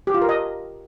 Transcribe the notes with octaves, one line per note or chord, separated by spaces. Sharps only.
G4
F4
A#4
D#5